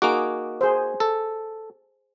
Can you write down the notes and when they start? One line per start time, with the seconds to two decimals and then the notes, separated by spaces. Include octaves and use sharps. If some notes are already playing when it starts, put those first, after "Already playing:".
0.02 A#3 D#4 F#4 G#4 D6
0.61 G#4 C5
1.00 A4